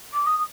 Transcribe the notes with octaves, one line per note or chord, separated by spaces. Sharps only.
D6
D#6
D#6